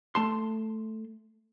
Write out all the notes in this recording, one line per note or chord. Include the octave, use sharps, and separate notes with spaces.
A3 A5 C6